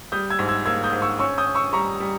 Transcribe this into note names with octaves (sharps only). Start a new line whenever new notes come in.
G3 D#6 G6
E6 G#6
G#2
E6 G#6
A#3 E6 G#6
D#6 G6
G#2
C#6 E6
C#4 C#6 E6
D#6 G6
C#4
C#6 E6
G3 A#5 C#6
G3